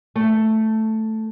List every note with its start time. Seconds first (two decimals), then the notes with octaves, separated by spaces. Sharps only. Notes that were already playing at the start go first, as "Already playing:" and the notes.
0.15 A3